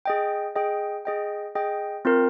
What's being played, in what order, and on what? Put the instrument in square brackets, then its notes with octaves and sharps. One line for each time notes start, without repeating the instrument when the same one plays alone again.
[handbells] G#4 D#5 G5
G#4 D#5 G5
G#4 D#5 G5
G#4 D#5 G5
C4 F4 A#4